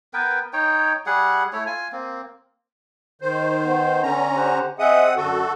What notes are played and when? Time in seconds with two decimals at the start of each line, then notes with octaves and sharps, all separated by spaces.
0.14 B3 A#4 B4 G5
0.53 D#4 C#5 G5
1.06 G3 G#4 F#5
1.53 A3 E4 C#5
1.66 F4 G#5
1.92 A#3 C4
3.22 D#3 C5
3.62 B3
4.03 D3 C#4 A#5
4.35 G4 C5 F#5
4.79 C4 G#4 D#5 E5 F#5 D#6
5.16 F#2 D3 F#4 A4